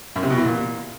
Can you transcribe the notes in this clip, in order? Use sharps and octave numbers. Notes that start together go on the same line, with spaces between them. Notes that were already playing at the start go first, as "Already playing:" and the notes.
F#2
C3
B2
E3
A#2